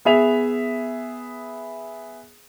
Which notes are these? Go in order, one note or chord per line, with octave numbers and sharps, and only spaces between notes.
B3 G#4 E5 F7